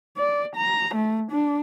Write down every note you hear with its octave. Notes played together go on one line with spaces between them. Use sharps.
D5
A#5
A3
D4